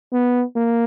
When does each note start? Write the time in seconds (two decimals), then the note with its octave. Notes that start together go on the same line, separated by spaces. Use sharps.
0.13 B3
0.56 A#3